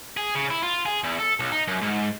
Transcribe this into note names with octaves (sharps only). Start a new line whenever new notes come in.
G#4
C#3
E4
F4
G#4
E2
A4
B1
D#4
F#2
G#2